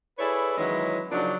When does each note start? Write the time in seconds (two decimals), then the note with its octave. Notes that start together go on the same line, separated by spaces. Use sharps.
0.19 E4 G#4 A4 B4 C#5 D5
0.58 D#3 E3 F#3 G#3 C#4 E4
1.10 C#3 F3 F#3 A#3 D4 D#4